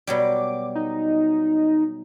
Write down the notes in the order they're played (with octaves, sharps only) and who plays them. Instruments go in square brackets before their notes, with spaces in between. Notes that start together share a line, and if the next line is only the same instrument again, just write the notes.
[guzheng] B2 F#3 G3 [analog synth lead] D6
[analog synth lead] D#4